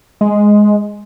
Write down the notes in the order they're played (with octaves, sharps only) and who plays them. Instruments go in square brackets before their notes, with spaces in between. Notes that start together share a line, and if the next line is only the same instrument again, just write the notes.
[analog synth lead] G#3